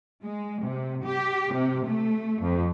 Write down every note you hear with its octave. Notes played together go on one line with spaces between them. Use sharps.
G#3
C3
G4
C3
A3
F2